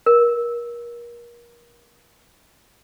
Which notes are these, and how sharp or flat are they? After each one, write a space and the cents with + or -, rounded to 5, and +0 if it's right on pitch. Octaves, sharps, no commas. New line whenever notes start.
A#4 +30